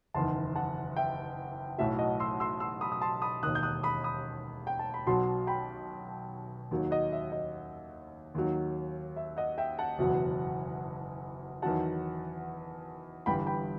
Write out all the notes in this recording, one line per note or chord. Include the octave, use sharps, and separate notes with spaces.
F#1 E2 D#3 A5 C6
F#5 A5
E5 G5
B1 A2 F#3 E5
D#5 F#5
C6 E6
C6 E6
C6 E6
B5 D#6
D#6
A5 C6
B5 D#6
E1 D#2 D#3 D#6 F#6
G6
D#6 F#6
B5 D#6
B5 D#6
G5
A5
B5
B1 B2 F#3 A5 C6
G5 B5
D#2 D#3 F#3
D#5 F#5
E5
D#5
D#2 D#3 F#3
E5
D#5 F#5
E5 G5
F#5 A5
F#1 E2 B2 F#3
E2 D#3 F#3 F#5 A5
G1 G2 E3 G5 B5
G5 B5